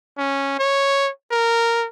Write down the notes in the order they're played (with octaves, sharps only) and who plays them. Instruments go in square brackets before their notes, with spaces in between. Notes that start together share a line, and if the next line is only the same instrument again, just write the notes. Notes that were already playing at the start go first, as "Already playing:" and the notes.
[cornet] C#4
C#5
A#4